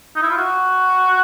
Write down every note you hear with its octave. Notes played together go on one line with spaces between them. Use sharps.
D#4
E4
F4
F#4